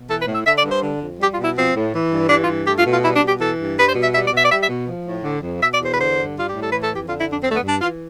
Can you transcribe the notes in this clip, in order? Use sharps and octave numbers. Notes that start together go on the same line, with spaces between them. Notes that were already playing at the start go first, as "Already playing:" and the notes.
Already playing: B2
E3 A4
B4
A2
E5
D3 E5
D5
G2
C5
D3
F2
G3 G4
F4
B2
E4
F3 C4
A2
E3
G2
E3 D4
F4
G2
A3 G4
F4
B2
F4
G3 E4
D4
B2
G4
E3 A4
G2
G3 B4
C5
B2
E5
G3 E5
D5
B2
E5
D5
G3 E5
E5
B2
F3
A2
D3
F2
B2 E5
D5
E2
C5
B4
D3 C5
G2
G3 F4
A2 G4
A4
E3 B4
A4
F2
G4
D3 F4
E4
F2
D4
D3 C4
A3
B3
G2
D4
E3 F4